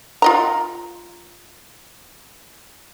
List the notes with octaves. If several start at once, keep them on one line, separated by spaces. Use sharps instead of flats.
F4 D#5 A#5